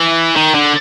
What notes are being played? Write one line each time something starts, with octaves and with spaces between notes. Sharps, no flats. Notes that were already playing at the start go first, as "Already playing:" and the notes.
Already playing: E3
D#3
D3